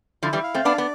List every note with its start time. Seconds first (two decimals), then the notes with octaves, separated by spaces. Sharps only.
0.23 D3 F3 E4
0.33 E3 G3
0.43 F5
0.54 A3 C4
0.64 B3 D4 D5
0.78 B3